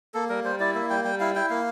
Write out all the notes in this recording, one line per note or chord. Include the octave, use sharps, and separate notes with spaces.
A#3 A4
G3 A#4
G3 C5
E4 D5
A#3 E5
G3 G5
G3 G5
E4 F5
E4 G5
A#3 F5